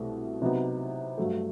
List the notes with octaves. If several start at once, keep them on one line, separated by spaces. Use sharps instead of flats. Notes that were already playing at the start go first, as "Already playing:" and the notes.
Already playing: C2 B2 A3
C3 F#3 B3 D#4
G2 F#3 A3